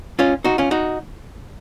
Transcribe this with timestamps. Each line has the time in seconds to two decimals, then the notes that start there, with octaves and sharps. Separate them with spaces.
0.19 C#4 F4
0.44 D#4 F#4
0.58 C#4 F4
0.71 D#4 F#4